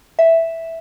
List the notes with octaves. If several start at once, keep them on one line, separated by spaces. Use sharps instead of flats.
E5